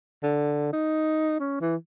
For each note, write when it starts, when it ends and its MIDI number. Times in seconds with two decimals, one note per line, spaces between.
0.23 0.68 50
0.73 1.38 63
1.40 1.61 61
1.61 1.76 52